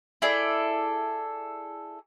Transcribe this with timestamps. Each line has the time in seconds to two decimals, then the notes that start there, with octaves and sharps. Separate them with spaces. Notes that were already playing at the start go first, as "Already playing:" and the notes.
0.22 E4 G#4 A4 D5